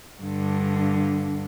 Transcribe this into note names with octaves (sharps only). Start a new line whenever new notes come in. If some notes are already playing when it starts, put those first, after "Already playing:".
G2 D3